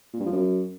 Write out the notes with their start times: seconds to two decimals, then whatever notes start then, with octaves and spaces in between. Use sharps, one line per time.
0.13 A#2
0.20 G2
0.26 F3
0.32 F#2